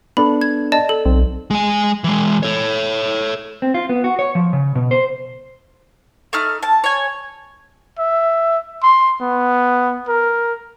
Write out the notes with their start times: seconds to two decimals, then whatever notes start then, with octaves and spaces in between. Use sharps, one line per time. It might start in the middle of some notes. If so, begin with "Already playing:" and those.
0.17 B3 D4 A4 B5
0.41 G#6
0.72 D5 D#5 A5
0.89 A4
1.05 B1 C4
1.50 G#3 G#5
2.04 E3 G#3
2.43 A4 C#5
3.62 C4
3.74 F4
3.89 B3
4.04 F#4
4.19 C#5
4.35 F3
4.53 C#3
4.75 B2
4.91 C5
6.33 A3 D#4 F6
6.63 A5
6.84 C#5 G#5
7.99 E5
8.83 C6
9.21 B3
10.08 A#4